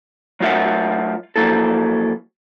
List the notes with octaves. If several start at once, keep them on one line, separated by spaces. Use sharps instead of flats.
F#3 A3 F4 A#4 E5 F#5
F3 F#3 A#3 E4 A4